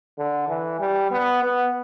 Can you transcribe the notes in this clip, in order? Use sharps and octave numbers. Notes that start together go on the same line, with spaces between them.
D3
E3
G3
B3
B3